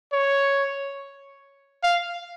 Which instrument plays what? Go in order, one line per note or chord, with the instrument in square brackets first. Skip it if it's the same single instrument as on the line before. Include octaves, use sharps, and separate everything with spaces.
[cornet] C#5
F5